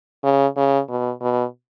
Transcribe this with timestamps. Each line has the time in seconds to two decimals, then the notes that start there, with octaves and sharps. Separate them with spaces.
0.24 C#3
0.57 C#3
0.89 B2
1.21 B2